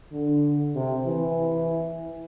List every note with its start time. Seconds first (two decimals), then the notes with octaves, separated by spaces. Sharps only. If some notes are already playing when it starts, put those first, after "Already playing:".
0.12 D3
0.76 C3
1.06 E3